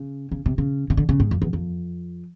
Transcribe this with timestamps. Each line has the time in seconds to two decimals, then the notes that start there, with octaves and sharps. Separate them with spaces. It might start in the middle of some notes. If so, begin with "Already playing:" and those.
Already playing: C#3
0.32 C#3
0.46 C3
0.58 C#3
0.90 C#3
0.97 D3
1.09 C#3
1.20 G#2
1.31 F2
1.42 E2
1.53 F2